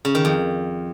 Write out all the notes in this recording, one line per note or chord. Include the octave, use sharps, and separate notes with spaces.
C#3
D#3
F2